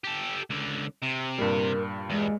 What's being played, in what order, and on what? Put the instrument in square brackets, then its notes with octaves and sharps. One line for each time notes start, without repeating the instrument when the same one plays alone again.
[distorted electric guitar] G4 A4
C#2 D3
C3
[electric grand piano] G2 A#2 G3 [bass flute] A#4
[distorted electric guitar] E2 [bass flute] G#3